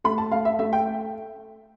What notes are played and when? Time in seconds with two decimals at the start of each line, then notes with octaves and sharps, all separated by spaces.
0.04 A3 B5
0.18 A5
0.32 A3 F5
0.45 E5
0.59 A3 E5
0.73 G5